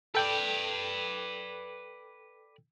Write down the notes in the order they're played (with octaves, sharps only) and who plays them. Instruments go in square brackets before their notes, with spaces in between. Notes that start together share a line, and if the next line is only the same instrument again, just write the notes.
[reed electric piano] A4 G5 [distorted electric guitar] B4 D5